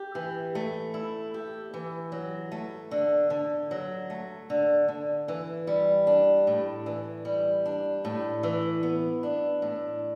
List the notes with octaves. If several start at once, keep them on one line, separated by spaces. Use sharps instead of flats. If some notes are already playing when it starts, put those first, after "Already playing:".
Already playing: G4
E3
A3
E4
G4
E3
F#3
A3
D3
D3
F#3
A3
D3
D3
E3
G3
D4
A2
E3
G3
D4
A2
E3
B3
D4
A2